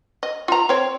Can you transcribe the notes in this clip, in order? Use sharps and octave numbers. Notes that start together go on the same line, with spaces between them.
D#5
F4 A#5
C4 C#5